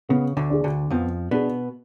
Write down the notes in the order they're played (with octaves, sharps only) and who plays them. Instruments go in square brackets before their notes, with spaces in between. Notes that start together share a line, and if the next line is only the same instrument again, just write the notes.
[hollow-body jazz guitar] C#3 [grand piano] B3
[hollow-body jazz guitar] D2 D3
[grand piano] D4 G#4
[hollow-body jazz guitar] D2 D3
[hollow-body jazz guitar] F2 F3 [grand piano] B3
[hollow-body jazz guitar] B2 B3 [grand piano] D4 G#4